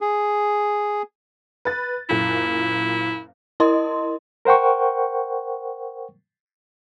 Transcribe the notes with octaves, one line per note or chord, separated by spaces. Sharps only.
G#4
B4 A6
F#1 A#2 E4
E4 A#4 D#5 C6
A#4 C5 F#5 G5 C#6